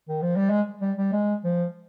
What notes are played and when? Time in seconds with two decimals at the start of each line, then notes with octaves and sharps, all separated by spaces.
0.09 D#3
0.22 F3
0.36 G3
0.50 G#3
0.81 G3
0.98 G3
1.13 G#3
1.44 F3